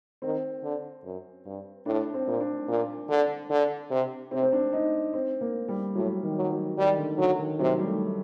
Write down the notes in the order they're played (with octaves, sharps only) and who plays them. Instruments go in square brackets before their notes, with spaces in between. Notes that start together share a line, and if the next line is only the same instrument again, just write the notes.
[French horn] D#3 [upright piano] C4
[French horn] D3
F#2
G2
[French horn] A2 [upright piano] D4
[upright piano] C4
[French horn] A#2
[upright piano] D4
[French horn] A#2
D3
D3
C3
[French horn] C3 [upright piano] C4
[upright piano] C4
D4
D#4
C4
A#3
G3
[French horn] A2 [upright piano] F#3
[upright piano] D#3
[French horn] F#3
[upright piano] F#3
[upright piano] D#3 [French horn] G3
[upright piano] D3
[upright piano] D3 [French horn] F#3
[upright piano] D#3
[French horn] C3 [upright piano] F#3
[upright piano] G3
A3